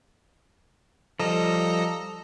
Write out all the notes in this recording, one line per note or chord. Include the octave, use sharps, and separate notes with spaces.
F3 G3 A4 D#5 A#5